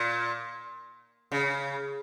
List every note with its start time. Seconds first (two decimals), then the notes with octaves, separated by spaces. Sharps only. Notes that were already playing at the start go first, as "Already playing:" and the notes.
Already playing: A#2
1.32 C#3